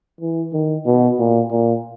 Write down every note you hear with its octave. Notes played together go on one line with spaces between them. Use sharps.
E3
D#3
B2
A#2
A#2